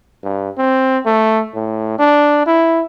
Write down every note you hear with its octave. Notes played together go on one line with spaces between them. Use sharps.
G2
C4
A3
A2
D4
E4